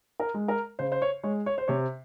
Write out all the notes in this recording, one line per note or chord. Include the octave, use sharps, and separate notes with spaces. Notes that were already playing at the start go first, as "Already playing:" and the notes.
A#4
G#3
A#4
C#3 C5
C5
C#5
G#3 C#5
C#5
C5
C3 C#5